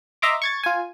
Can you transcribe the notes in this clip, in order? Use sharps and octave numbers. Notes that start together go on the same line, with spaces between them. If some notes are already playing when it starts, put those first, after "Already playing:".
D#5 E5 A#5 C6 D6
C#6 G#6 A6
F4 G#5